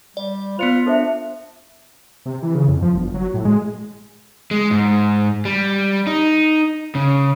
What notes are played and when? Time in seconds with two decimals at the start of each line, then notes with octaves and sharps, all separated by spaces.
0.17 G3 D5
0.59 B3 F4 C5 C#7 F7
0.86 D4 A4 C5 E5
2.26 C3
2.42 E3
2.55 C#3
2.68 F2
2.82 F3
2.95 G1
3.14 F#3
3.34 A2
3.45 G#3
4.51 G#3
4.71 G#2
5.45 G3
6.07 D#4
6.95 C#3